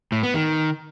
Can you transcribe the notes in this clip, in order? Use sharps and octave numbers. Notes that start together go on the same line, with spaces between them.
A2
B3
D#3